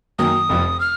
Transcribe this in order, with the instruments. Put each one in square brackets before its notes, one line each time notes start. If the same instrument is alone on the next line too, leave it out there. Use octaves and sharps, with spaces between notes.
[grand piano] F#2 D#3 F#3 A#3 [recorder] D#6
[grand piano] F1 F2 F3
[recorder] F6